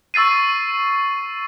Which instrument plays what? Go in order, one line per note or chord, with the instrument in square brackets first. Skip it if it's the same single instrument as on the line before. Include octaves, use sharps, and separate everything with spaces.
[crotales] C#6 E6 A6 C7 D#7